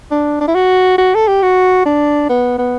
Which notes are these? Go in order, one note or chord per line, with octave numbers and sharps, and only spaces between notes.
D4
D4
E4
F#4
F#4
A4
G4
F#4
D4
B3
B3